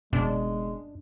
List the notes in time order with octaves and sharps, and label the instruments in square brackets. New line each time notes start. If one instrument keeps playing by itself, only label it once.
[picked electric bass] F#1 B2 [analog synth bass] F#2 [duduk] G#3 [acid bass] D4